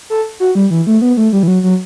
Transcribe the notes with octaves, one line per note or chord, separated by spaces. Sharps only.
A4
F#4
G3
E3
A3
B3
A3
G3
E3
F#3
F#3